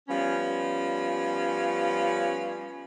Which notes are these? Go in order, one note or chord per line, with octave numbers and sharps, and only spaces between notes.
F3 G3 B3 C#4